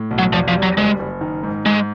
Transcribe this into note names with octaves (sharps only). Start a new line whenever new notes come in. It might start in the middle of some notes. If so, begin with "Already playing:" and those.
Already playing: A2
B1
F#3
E2 F3
F3
G3
F#3
F#1 G#3
F#1
D#3
G#2
G#2 G#3